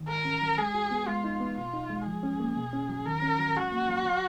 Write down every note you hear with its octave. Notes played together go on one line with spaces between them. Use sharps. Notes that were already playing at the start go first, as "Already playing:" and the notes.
Already playing: D#3
G#2 A#4
C#4
F#3
G#3 G#4
F#4
B3
G#3 F4
D#4
B3
B2 F4
D#4
G#3
F3 G#4
C#4
A#3
B2
C#4
F#3
D#3 A#4
C#4
F#3
G#2 F#4
A#3
F#3
F#3